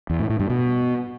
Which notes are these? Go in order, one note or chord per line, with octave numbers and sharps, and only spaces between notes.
E2
A2
A2
G2
B2